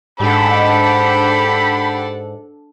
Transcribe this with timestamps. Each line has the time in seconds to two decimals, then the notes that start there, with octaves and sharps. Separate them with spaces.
0.20 G#2 D4 G4 A4 F#5 B5